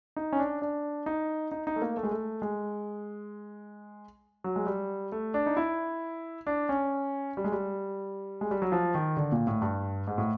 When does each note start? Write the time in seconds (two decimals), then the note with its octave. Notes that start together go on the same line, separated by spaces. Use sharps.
0.16 D#4
0.33 C#4
0.39 D4
0.62 D4
1.06 D#4
1.52 D#4
1.67 D#4
1.76 A3
1.82 A#3
1.97 A3
2.03 G#3
2.11 A3
2.42 G#3
4.44 F#3
4.56 G#3
4.67 G3
5.12 A3
5.34 D4
5.46 D#4
5.57 E4
6.47 D4
6.69 C#4
7.37 G3
7.44 G#3
7.52 G3
8.41 G#3
8.51 G3
8.62 F#3
8.72 F3
8.95 D#3
9.17 D3
9.32 A#2
9.47 A2
9.62 G2
10.07 G#2
10.18 A2